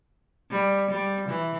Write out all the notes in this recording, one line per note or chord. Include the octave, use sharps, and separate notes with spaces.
G3
G3
E3